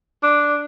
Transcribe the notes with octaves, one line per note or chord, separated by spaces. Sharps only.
D4